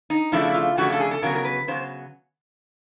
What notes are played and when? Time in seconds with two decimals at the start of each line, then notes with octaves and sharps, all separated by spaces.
0.10 D#4
0.32 F2 C#3 F3 A3 D4 E4
0.54 F4
0.77 F2 C#3 F3 A3 D4 F#4
0.92 A4
1.00 G#4
1.11 A4
1.22 C#3 F#3 B3 A#4
1.35 A#4
1.45 B4
1.68 C#3 F#3 B3 C5